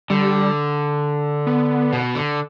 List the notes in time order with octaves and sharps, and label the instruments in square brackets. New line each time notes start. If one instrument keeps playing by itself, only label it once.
[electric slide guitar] D3 [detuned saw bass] G3
[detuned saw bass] B3
[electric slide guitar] B2
D3